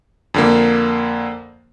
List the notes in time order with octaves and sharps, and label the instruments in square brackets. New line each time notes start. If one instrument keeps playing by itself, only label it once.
[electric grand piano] F2 D3 A#3